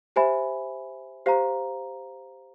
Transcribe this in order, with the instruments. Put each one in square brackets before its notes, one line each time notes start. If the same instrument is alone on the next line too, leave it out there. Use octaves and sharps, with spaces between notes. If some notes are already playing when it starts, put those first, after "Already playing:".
[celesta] G4 C5 E5 G#5 B5
G4 C5 F5 A#5